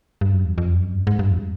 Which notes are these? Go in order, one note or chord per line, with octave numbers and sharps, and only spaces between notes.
G2
F#2
E2
F2
F#2
G2
G#2
G2
F2